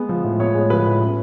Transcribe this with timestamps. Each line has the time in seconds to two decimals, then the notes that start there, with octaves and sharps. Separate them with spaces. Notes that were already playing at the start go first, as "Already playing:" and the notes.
Already playing: G#3 B3
0.09 F3
0.24 A2
0.40 B3 C#5
0.54 G#3
0.70 F3 B4
0.86 A2
1.00 C#4